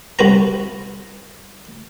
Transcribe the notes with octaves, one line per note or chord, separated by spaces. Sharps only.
C2 F#4 B4 A#5